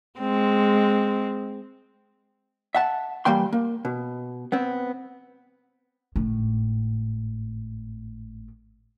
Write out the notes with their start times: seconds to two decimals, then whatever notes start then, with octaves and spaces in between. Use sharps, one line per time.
0.20 G#3 C4
2.75 E5 F#5 A5
3.25 E3 G3 A#3 G5 C6
3.53 A#3
3.85 B2
4.52 B3 C4
6.16 G#1 A2